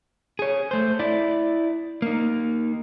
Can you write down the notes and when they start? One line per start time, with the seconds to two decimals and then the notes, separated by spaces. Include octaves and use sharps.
0.39 G#4 C#5
0.71 A3 C5
0.99 E4 D5
2.02 A#3 D#4